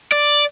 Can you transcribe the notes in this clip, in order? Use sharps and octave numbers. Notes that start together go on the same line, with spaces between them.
D5